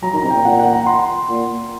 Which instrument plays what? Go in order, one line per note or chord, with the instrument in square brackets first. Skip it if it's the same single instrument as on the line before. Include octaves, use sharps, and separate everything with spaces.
[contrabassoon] F#3 [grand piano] A#5
[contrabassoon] D#3
[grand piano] A#5
[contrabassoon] C3
[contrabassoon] A#2 [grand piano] G5
[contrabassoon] A#2 [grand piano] F#5
[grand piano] F#5
A#5
C6
[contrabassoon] A#2